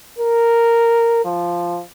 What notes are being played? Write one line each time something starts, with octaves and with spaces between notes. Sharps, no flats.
A#4
F3